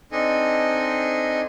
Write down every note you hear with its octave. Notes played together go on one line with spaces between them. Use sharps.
C4 D4 D#4 A4 D#5 G#5